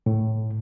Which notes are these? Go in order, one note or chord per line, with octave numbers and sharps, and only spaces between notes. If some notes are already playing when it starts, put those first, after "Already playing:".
A2